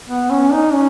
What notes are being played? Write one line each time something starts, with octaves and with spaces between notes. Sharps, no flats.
B3
C#4
D#4
C#4